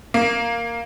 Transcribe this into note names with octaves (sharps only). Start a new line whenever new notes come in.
A#3